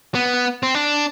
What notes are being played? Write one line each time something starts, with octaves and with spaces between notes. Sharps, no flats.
B3
C4
D4